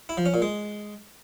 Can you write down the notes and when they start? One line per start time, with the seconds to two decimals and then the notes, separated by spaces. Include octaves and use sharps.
0.09 E4
0.17 F3
0.26 C#4
0.34 A#2
0.42 G#3